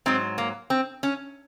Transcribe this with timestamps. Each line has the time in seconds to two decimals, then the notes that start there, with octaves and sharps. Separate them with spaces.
0.06 G#2 F#3 C4
0.38 A#3
0.70 C4
1.03 C#4